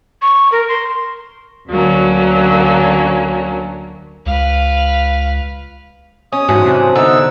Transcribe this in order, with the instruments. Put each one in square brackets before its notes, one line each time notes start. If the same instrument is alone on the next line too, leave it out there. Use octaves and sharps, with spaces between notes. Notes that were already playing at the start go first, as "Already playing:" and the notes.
[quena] C#6
A#4
C6
[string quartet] D2 D3 F#3 A#3 C#4
[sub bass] C#2 [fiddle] B4 F5
[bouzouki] C#4 [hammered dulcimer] D#5 [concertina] D#6
[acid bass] G#2 [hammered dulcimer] E3 C5 [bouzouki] F#3 C#4 D4
[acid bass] C3
[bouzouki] D3 B3 [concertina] D#4 E6